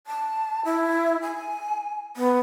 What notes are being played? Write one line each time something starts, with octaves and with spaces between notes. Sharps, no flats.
A5
E4
G#5
B3